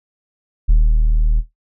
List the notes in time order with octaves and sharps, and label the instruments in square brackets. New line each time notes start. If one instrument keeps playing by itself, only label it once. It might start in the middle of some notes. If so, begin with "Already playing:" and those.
[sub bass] D#1